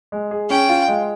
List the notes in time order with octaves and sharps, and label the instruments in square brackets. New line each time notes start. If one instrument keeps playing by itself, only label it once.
[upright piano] G#3
G#4
[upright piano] C#4 [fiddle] G5
[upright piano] F4
G#3